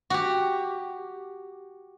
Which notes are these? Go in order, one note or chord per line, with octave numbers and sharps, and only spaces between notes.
F#4 G4